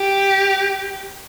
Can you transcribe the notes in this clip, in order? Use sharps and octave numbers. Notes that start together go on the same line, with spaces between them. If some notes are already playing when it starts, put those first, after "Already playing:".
Already playing: G4